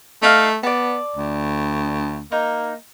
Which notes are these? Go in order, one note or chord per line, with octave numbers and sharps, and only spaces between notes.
A3 D#4 F5
B3 D5 A5
D2
A#3 D#4